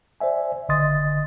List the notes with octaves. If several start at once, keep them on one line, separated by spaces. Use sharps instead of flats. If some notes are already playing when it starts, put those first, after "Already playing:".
C5 D5 E5 G#5
G1 D3 D#5 C6 D#6 A6